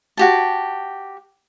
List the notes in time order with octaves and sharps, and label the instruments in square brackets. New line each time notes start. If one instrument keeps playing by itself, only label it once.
[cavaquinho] F#4 G4 A5